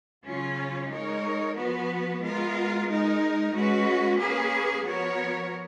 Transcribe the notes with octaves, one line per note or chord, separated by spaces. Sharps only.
C#3 F#3 C#4 F4
G#3 D#4 A#4 C#5
F3 B3 F#4 B4
G#3 B3 F4 A#4
G#3 D#4 A#4
G#3 C#4 F#4 B4
A#3 C#4 G#4 B4
F3 B3 F#4 A#4 C#5